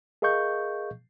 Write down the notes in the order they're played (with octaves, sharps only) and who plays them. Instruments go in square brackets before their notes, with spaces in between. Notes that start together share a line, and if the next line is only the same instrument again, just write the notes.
[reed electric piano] G#4 A#4 D#5 F5 C#6 G6